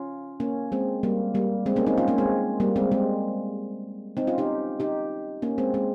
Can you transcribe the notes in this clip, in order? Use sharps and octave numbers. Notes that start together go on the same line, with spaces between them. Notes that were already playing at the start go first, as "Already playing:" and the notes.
Already playing: C#4 F4
A#3 C#4
G#3 C4
G3 A#3
G3 A#3
G#3 C4
A#3 C#4
C4 D#4
C#4 F4
A#3 C#4
G#3 C4
G3 A#3
G#3 C4
G#3 C4
C4 D#4
C#4 F4
D#4 G4
D#4 G4
A#3 C#4
G#3 C4
G#3 C4